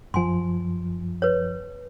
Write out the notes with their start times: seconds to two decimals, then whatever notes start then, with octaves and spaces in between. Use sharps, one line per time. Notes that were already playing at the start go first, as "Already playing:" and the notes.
0.14 F#2 F3 G#5 C6
1.22 B4 C#5